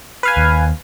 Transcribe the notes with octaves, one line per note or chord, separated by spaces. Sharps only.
B4 F5 G#5
D#2